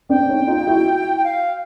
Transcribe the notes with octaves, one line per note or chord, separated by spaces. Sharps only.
C4 D4 G5
C#4 D#4
D#4 F4
E4 F#4
F5